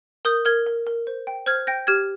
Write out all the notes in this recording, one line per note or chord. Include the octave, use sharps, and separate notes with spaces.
A#4 D#6 G6
A#4 F6 G#6
A#4
A#4
C5
G5
C5 F6 G#6
G5 G6 A#6
G4 F6 G#6